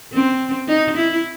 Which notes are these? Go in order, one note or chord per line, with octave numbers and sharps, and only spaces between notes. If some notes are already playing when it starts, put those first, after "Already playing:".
C4
D#4
E4